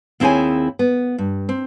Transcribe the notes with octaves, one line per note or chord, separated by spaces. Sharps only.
D#2 C4 E4 G#4 C#5 G#5
B3
G2
C4